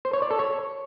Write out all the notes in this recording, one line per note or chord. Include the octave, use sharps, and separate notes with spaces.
C5
C#5
D5
A4
C#5